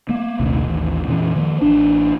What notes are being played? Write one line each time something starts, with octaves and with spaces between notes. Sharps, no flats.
A#3 B3
A#1 D#2 C3 A3
A1 D#2
F2 A#2 E3 C#4
D#3 F3 A#3
A1 D4